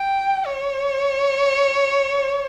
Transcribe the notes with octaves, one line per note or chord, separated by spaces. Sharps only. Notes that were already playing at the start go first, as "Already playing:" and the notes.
Already playing: G5
C#5